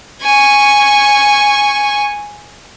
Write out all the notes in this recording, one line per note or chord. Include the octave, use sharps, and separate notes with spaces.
G#5 C#6